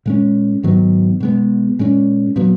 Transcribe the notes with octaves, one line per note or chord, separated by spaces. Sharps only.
A#2 G#3 C#4
G#2 D#3 F#3 B3
B2 G#3 B3
A#2 G#3 C#4
A#2 F#3 B3